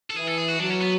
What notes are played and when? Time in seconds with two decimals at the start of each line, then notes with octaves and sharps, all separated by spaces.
0.10 A4
0.16 E3 G#4
0.27 A4
0.38 G#4
0.48 F#4
0.59 F#3 D4
0.70 C#4
0.82 B3